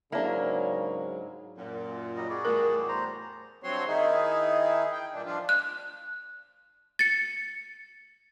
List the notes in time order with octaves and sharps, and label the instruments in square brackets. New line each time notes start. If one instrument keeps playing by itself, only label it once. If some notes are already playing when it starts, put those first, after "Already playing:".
[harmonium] G#2 F#3 G#3 [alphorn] C#3 [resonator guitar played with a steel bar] A#3 [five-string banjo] D4 E4
[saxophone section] F#2 A#2
[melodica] F#3 G3 D#5
F#4 G#4 D5
[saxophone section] E2 A2 G3 [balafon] A3 A#4
[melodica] C5 A#5
[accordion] G2 F#3 C4 F#4 C#5 C6
D#3 D#4 E4 G#4
G5
G2 A#2 D4
F3 D4 F4
[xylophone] F#6
A6 C#7